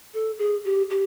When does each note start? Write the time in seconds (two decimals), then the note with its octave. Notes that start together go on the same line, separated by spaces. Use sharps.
0.14 A4
0.39 G#4
0.65 G4
0.90 G4